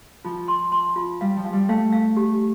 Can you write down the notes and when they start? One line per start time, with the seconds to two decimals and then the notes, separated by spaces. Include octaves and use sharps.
0.25 F3 F4
0.48 C6
0.72 C6
0.96 F4
1.21 G3 F5
1.37 F3
1.45 F5
1.53 G3
1.69 A3 F5
1.93 F5
2.17 G4